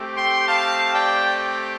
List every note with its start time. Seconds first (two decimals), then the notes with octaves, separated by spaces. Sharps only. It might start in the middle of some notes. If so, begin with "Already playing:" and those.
Already playing: A3 C4 G4
0.17 G5 C6
0.48 F5 A5
0.94 D5 G5